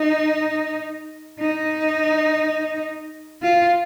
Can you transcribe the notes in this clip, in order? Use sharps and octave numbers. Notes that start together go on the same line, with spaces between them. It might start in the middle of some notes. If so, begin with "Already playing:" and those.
Already playing: D#4
D#4
F4